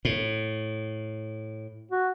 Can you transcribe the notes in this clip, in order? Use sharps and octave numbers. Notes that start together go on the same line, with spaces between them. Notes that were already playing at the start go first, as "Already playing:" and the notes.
A2
F#4